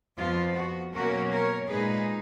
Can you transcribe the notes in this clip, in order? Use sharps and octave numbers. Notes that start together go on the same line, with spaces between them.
F2 F3 B3 F4
F#4
B2 F#3 A#3 C#4 F#4 A#4
A#4 C#5
A#2 G#3 D#4 G#4 B4